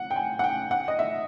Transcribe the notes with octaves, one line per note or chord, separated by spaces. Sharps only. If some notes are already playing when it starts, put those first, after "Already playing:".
Already playing: F#5
G5
G#5
F#5
G5
F#5
D#5
E5